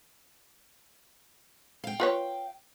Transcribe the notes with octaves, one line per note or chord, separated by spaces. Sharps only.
F5 G5
F4 B4 C#5